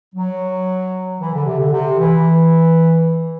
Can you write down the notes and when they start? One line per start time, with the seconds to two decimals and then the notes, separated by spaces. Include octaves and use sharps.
0.15 F#3
1.20 E3
1.33 D3
1.46 C3
1.59 D3
1.72 C3
1.99 E3